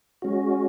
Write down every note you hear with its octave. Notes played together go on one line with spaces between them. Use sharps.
G#3 C#4 F#4